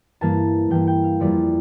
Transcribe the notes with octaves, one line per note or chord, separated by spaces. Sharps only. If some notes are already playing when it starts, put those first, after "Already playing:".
G2 E3 A#3 A5
G2 E3 A#3 G5
G5
F5
F2 E3 G3 A#3 D5